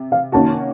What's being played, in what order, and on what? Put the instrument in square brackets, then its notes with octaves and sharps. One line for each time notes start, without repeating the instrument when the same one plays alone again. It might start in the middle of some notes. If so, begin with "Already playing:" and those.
Already playing: [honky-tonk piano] C3
[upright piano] F5
[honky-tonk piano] D#3 A#3 C#4 F#4 [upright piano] A5